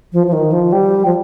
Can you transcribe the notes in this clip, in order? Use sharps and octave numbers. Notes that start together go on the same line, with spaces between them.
F3
F3
D#3
F3
G3
F3